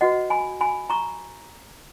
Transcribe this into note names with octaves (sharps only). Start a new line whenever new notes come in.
F#4 B4 D#5 F#5
G#5 B5
G#5 B5
A#5 C#6